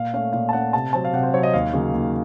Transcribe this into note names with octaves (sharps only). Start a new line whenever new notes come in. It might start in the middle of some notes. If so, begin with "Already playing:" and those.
Already playing: A#2 F5
A3 C#4 F5
A#2 F5
A5
A3 C#4 F#5
C3 A5
F#3 C4 A5
F5
C3 F#5
C5
F#3 C4 C#5
D#5
D#2 F5
C#3 F#3 A#3
D#2